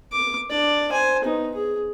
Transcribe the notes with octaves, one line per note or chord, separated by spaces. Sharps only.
D6
D4 D5
C5 G#5
B3 D#4
G#4